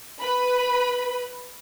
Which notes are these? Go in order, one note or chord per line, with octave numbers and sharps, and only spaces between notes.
B4 B5